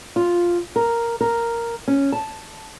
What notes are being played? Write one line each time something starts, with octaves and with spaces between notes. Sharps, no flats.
F4
A#4
A#4
C#4
A5